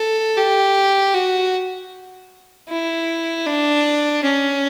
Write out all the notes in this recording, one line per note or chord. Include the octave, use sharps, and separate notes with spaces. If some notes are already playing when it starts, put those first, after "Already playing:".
Already playing: A4
G4
F#4
E4
D4
C#4